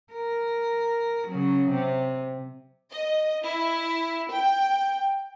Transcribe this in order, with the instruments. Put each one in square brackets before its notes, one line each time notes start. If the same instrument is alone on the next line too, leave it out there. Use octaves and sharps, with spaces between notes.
[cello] A#4
C#3 F#3
C3
[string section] D#5
E4
G5